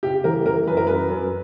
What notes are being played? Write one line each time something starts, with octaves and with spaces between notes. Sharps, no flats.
C#3 G4
E3 A#4
E3 A#4
F#2 B4
A#4
F#2 B4
F#2